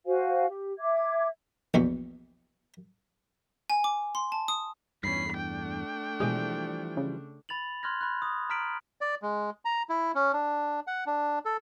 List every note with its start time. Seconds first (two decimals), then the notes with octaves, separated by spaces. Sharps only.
0.06 F#4 C5 F5 G#5
0.48 G4
0.79 E5 D6 G#6
1.74 A#1 E2 B2
3.70 G#5
3.84 D6
4.15 C6
4.32 A5
4.48 D#6
5.04 E2 G2 C#4 B5 C7
5.37 A3 D4 G5
6.20 B2 E3 F3 G3 G#3 G#4
6.97 C#3
7.49 B5 A6 F7 F#7
7.83 C6 F6 F#6 G#6 A#6
8.01 B5 F#6
8.22 D#6
8.50 A#5 F6 B6 D7 F#7
9.01 D5
9.22 G#3
9.65 A#5
9.89 E4
10.15 C#4
10.33 D4
10.87 F#5
11.06 D4
11.45 A4